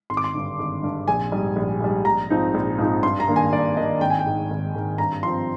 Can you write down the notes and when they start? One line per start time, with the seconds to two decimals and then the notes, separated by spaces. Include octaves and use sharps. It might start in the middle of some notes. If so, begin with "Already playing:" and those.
0.10 G#1 C6
0.17 D6
0.24 C6
0.34 G2 D3
0.59 G#1
0.83 G2 D3
1.08 A#1 G#5
1.32 G#2 G3
1.56 A#1
1.80 G#2 G3
2.05 A#1 A#5
2.30 G#2 F3 C4 D#4
2.54 A#1
2.78 G#2 F3 C4 D#4
3.03 G2 C6
3.20 A#5
3.28 D#3 A#3 D4
3.36 G#5
3.53 G2 D5
3.77 D#3 A#3 D4 D#5
4.01 G#1 G5
4.10 G#5
4.19 G5
4.26 G#2 D#3
4.50 G#1
4.74 G#2 D#3
4.98 G2 A#5
5.23 F3 C4 C6